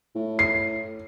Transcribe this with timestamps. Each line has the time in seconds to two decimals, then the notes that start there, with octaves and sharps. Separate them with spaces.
0.16 A2
0.39 C7